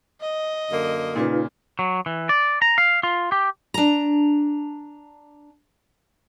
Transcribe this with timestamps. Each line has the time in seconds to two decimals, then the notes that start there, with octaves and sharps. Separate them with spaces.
0.21 D#5
0.70 F#2 D3 A#3
1.16 A#2 C#3 D#4 F4 B4
1.79 F#3
2.06 E3
2.29 D5
2.62 A#5
2.78 F5
3.03 F4
3.32 G4
3.74 D4 A#5